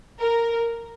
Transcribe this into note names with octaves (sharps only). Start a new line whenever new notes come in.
A#4